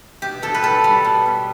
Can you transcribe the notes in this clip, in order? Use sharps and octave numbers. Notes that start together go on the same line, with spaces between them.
B2 G4
B2 A4
B4
G3 A4
G3
B2
B2